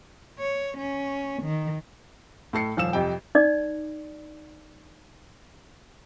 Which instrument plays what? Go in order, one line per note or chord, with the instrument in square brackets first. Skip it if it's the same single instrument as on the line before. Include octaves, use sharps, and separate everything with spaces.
[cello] C#5
C#4
D#3
[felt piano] A2 A4 C7 C#7
D#1 F3 F5 E6 E7
F2 C3 G5
[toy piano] D#4 D5